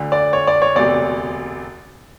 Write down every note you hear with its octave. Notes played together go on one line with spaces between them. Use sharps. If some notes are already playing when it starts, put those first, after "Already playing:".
Already playing: D2 D3
D5
C#5
D5
C#5
E1 D2 C3 D5